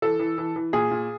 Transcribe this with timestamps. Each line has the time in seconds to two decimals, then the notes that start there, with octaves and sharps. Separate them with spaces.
0.02 E3 A4
0.20 E3
0.38 E3
0.56 E3
0.73 A#2 G#4
0.91 A#2